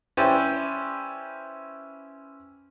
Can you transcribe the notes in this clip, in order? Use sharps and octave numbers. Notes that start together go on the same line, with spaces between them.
C#4 E4 G4 B4 C5 D5